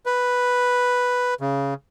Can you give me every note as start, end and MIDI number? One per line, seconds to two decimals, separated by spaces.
0.06 1.34 71
1.41 1.74 49